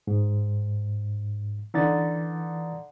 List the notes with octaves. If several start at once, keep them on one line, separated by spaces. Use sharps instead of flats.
G#2
D3 E3 D#4 A6